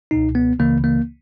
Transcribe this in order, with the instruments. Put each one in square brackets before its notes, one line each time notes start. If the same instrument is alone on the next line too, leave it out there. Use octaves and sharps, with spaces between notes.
[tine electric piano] C#2 B2 D#4
B3
C#2 C#3 E3 A#3
A#3